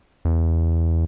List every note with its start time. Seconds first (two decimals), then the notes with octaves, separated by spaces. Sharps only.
0.25 E2